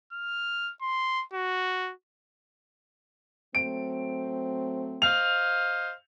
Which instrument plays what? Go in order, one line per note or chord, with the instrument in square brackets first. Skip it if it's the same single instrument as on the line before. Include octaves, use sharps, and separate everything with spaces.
[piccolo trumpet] F6
C6
F#4
[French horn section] F#3 A3 C4 [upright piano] D7
[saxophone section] C5 D#5 F5 [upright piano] F7